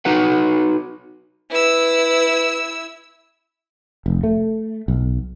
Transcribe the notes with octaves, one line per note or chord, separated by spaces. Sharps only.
D#4 F#4 B4 F#5
E4 B4 E6
F1
A3
B1